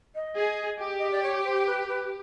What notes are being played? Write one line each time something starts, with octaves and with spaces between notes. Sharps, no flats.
D#5
G#4
G4
D#5
D5
C#5
C5
B4
B4